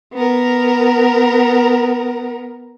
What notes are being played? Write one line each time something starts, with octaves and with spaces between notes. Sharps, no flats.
B3 A#4